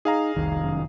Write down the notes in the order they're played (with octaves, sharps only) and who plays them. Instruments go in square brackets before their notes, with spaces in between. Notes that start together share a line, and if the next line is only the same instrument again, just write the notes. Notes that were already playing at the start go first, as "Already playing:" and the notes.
[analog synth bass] D#4 [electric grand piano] G#4 F5 A#5
[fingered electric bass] F1 D#3 [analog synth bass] C2
[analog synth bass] F#2